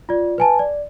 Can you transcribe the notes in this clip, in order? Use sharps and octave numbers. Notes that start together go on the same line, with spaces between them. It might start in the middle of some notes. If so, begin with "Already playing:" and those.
F4 D5
B4 G#5 A5
D5